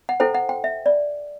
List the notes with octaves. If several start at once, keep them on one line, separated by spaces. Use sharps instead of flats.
F#5
E4 A4 C5 G5
F#5
G5
E5
D5